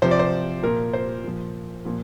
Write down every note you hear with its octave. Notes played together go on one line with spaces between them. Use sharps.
C3 F3 C5
D5
C5
A#2 F3 A#4
C5
A#2 F3
A#2 F3